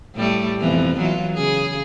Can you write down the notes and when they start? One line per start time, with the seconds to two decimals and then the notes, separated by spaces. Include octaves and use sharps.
0.15 A2 G3 A3
0.60 F2 B2 E3
0.98 E3 F#3 F4
1.34 C#3 G#4